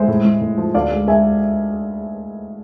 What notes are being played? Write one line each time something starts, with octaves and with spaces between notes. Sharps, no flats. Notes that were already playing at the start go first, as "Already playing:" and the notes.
Already playing: G#3 C5 E5
A2
A2
A2
F3
D2 D5 F5
G#3
G#3 E5 G#5